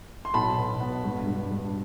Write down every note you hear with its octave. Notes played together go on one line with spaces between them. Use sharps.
C6
B1 A5 B5
B2
B3
G2
G2
G2